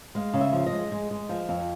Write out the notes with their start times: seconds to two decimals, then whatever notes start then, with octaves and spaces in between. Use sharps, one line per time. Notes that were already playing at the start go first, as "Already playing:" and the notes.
0.15 G#3 F5
0.34 C#3
0.41 E5
0.53 F3
0.67 D#5
0.73 G#3
0.92 G#3
1.11 G#3
1.29 F3
1.49 F2